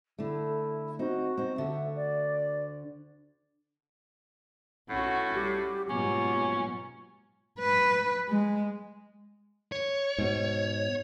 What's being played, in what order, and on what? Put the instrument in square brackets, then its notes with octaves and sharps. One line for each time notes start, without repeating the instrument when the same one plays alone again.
[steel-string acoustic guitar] D3 A3 [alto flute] E4
[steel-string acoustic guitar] C4 D#4 [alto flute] F#4
[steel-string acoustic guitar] C4 D#4
[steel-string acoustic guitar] D2 D3 F#4 [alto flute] E5
[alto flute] D5
[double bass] B1 [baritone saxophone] A2 [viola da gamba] C#4 F#4 [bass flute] F#5
[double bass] G3 [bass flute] G4
[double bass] G#2 F#3 [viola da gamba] B2 A#3 F4 [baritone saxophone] C#4 [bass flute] G4
[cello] B4
G#3
[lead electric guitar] C#5
[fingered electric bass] G#2 B2